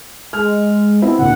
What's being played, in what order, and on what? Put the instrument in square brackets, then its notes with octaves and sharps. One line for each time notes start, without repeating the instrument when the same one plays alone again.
[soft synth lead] G#3 [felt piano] F6
[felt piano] B3 C4 E4
[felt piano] D2 A#2 [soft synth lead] F#5